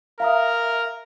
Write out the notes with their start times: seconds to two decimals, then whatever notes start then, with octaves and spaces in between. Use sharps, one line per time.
0.20 A#4 E5 F5 A#5 D#6